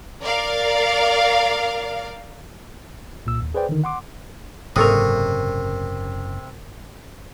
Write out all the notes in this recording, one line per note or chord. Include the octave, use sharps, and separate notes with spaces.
A#4 D5 F5
C2 A#2 E6
D#2
G#4 B4 C5 D5 G5
D3 D#3
F#5 C6 D6
F#1 G#2 C3 A4 A#4 C#6 D#6 E6